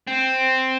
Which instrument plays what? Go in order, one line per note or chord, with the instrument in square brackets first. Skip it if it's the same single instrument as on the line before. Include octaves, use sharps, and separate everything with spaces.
[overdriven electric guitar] C4